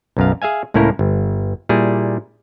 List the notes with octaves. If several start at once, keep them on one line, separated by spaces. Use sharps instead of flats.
B1 F#2 F5
G#4 E5 F5 G#5
C#2 A2 A#3 C#4 E4 A#4
G1
A#2 G3 E4 G#4